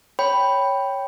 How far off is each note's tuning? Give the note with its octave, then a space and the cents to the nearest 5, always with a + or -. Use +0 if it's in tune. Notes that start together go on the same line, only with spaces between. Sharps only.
C#5 +0 G5 +0 B5 +0